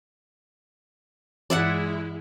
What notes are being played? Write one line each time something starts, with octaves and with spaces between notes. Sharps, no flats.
G2 E3 G#3 E4 D5 E5 F#5